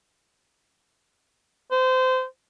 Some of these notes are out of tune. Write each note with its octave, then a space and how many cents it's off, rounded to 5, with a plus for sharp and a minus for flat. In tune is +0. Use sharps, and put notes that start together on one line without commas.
C5 -25